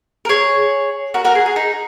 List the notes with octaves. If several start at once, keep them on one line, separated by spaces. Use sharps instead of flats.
A#4
G#4 C#5
F#4 A#4
F#4 A#4
G#4
G#4
D#4